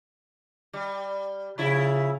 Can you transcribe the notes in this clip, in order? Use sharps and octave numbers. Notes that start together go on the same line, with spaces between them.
G3
C#3 F3 E4